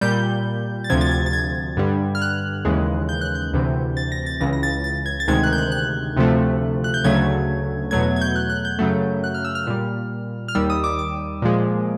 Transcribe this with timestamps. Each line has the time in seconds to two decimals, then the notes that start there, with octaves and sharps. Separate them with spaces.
0.01 A#2 G3 G6
0.84 A6
0.90 D2 C3 F3 G#6
1.01 A6
1.11 G#6
1.26 A6
1.33 G#6
1.77 G2 D3 G3
2.15 F6
2.22 F#6
2.65 D#2 C#3 E3 G#3
3.09 G6
3.21 F#6
3.35 G6
3.53 D2 C3 E3
3.97 A6
4.12 A#6
4.26 A6
4.40 C#2 C#3 E3 A#6
4.53 A#6
4.63 A6
4.84 A6
5.06 G#6
5.20 A6
5.28 D2 C3 D#3 G#3 G#6
5.43 F#6
5.53 G6
5.58 F#6
5.72 F#6
6.16 D2 C3 F3 A3
6.84 F#6
6.94 G6
7.04 D2 C#3 F#3 A3 G#6
7.91 E2 B2 F#3 A3 G#6
8.16 G#6
8.21 G6
8.36 F#6
8.50 F#6
8.65 G6
8.79 F#2 C#3 F#3 A3
9.24 F#6
9.34 F6
9.45 E6
9.55 F6
9.67 A#2 G3
10.48 F6
10.55 D#2 D#3 G3 E6
10.70 D#6
10.84 D6
10.99 D6
11.42 A#2 F3 G#3